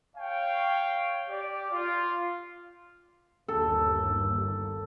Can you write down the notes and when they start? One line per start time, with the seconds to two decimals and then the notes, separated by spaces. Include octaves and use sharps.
0.17 C#5 F5 G5
1.29 G4 D5
1.71 F4
3.48 G1 D#2 A4